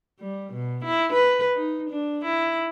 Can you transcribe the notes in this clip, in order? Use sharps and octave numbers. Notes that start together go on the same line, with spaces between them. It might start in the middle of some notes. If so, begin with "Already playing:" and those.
G3
B2
E4
B4
D#4
D4
E4